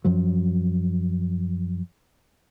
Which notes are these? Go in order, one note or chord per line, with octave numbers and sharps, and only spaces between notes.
F#2 F3 F#3